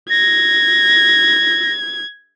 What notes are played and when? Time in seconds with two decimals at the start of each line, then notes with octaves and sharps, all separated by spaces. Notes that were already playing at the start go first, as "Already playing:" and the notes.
0.10 G#6 A#6